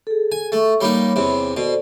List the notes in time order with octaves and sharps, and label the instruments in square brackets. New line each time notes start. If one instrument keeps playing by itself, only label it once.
[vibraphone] G#4 A4
[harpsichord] G#5
[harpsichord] A3 [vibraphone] A4 E5 C#6
[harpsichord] G3 A#3 D#4 [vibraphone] C#5 B5
[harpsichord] E2 C3
[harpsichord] B2 [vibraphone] A4 C5 D5